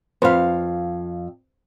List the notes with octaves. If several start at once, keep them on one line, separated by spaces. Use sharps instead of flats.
F2 B4 C5 F5